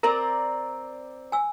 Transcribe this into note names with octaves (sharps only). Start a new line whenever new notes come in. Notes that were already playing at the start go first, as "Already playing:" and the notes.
C4 A#4 D5 A#5
G#5 E6